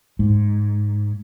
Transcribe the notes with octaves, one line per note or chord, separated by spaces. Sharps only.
G#2